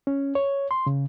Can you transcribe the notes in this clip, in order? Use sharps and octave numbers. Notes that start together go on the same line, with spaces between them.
C#4
C#5
C6
C#3